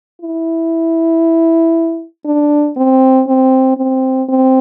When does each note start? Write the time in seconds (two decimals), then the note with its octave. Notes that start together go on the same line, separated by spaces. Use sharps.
0.22 E4
2.25 D4
2.77 C4
3.27 C4
3.77 C4
4.29 C4